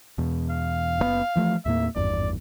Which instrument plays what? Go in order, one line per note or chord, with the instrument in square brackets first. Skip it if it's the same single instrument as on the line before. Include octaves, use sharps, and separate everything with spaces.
[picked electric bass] E2 B2
[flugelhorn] F5
[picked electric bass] F#1 C3 B3
E3 F3 A3
[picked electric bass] D#2 A2 A#3 [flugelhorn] E5
[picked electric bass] G#1 E2 G2 [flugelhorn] D5